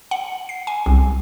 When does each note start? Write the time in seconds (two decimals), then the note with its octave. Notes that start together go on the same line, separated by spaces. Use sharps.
0.11 F#5
0.49 C7
0.67 G#5
0.86 C2